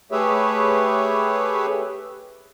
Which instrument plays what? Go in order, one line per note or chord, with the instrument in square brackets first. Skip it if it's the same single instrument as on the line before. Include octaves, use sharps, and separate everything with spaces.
[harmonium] A3 G4 G#4 B4 C#5 E5